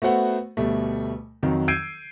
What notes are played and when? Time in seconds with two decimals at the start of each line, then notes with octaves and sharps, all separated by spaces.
0.02 A3 B3 F#4 C5 F#5
0.57 D2 B2 G3 A3
1.43 F2 D#3 F#3
1.68 E6 G6 G#6 C7 D7 D#7